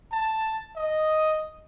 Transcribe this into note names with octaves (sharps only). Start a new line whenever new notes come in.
A5
D#5